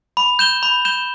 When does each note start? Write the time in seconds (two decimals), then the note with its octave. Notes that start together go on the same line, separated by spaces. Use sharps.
0.17 B5
0.39 G6 E7 G7
0.63 B5
0.85 G6 E7 G7